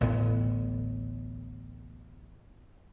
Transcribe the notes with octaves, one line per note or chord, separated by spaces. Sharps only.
A1 D2 A2 B3